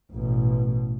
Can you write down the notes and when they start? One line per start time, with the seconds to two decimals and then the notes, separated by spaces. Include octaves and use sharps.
0.12 A1 B2